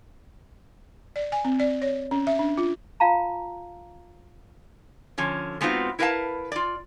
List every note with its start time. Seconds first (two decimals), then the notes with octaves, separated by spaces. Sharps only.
1.16 D5
1.32 G#5
1.45 C4
1.60 D5
1.82 C#5
2.11 C#4
2.27 E5
2.39 D4
2.58 F4
3.00 F4 F5 A5 A#5
5.18 D3 F3 C#4
5.61 G#3 B3 C4 D#4 F4 F#4
5.99 E4 A#4 B4 E5 F5 A5
6.52 F4 D5